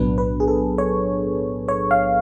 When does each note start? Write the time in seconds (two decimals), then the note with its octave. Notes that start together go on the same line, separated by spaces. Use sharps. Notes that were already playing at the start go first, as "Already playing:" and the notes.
Already playing: B1 A2 F#3 B3 D4 B4
0.18 B4
0.40 G#4
0.48 A4
0.78 C#5
1.68 C#5
1.91 F5